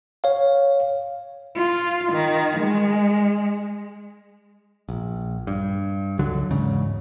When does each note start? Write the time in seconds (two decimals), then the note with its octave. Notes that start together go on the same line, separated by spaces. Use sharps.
0.24 C#5 F5
1.57 F4
2.12 D#3
2.59 G#3
4.89 A#1
5.47 G2
6.19 C#2 D3 F#3
6.51 E2 G#2 C#3